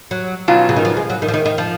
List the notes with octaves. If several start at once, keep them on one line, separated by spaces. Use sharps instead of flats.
F#3
B2 F#3 C#4 F4
C#3
D#3
F3
G#3
F#3
D#3
F3
D#3
D#3
F3